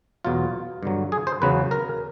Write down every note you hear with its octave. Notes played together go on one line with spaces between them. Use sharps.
E2 B2 F#3 F4
G2 D3 F#3
G#4
C5
E2 C#3 F#3 B4
A#4